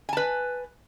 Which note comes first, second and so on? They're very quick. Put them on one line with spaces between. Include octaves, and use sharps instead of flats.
G#5 A5 B4